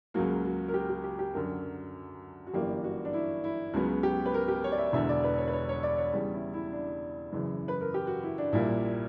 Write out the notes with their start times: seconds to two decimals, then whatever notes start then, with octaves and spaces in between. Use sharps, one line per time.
0.14 C#2 C#3 F#3 A#3 F#4
0.45 F#4
0.68 A#4
0.74 G4
0.90 G4
1.04 G4
1.19 G4
1.34 F#2 D3 F#3 A#4
2.47 F#4
2.53 G1 F#2 E3 G3 A#3 G4
2.84 F#4
3.05 D4
3.13 E4
3.44 E4
3.73 C#2 C#3 F#3 B3 F#4
4.03 G4
4.26 B4
4.34 A#4
4.48 G4
4.64 C#5
4.72 D5
4.78 E5
4.93 E1 E2 D3 E5
5.09 D5
5.24 B4
5.38 C#5
5.48 B4
5.53 C#5
5.69 C#5
5.83 D5
5.98 C#5
6.13 E2 C#3 G3
6.33 E4
6.54 E4
6.72 D4
7.32 F#1 F#2 C#3 E3
7.68 B4
7.81 A#4
7.94 G4
8.07 F#4
8.23 E4
8.38 D4
8.52 A#1 A#2 G3 A#3 E4